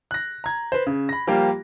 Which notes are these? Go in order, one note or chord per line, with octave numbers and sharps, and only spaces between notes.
F#6 A#6
A#5 G#6
B4 C5
C#3
B5 A#6
F3 G3 A#3 F4 G4